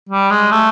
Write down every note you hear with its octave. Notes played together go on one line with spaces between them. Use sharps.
G3
G#3
A3